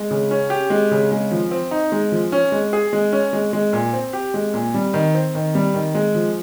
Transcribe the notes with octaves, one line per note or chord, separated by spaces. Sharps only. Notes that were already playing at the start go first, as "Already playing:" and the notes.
Already playing: G#3
C#3
C#4
G4
G#3
C#3
G#3
F3
C4
D#4
G#3
F3
C#4
G#3
G#4
G#3
C#4
G#3
G#3
A#2
C4
G4
G#3
A#2
G3
D#3
C4
D#3
G3
D#3
G#3
F3